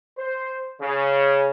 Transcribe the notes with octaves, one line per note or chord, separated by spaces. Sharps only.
C5
C#3